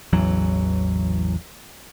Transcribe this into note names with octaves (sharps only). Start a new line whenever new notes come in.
A1 E2 E3 F#3